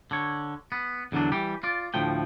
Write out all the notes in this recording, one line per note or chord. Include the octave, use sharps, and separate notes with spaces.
D3 C#5
B3
E2 D3 E3 F#3 D4
E3 G3 G4
F4 D5
D2 A2 F3 G5